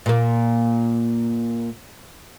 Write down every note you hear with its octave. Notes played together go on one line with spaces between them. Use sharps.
A#2 A#3